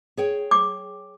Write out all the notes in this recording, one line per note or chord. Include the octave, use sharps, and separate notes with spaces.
G#4 C#5 G5
D6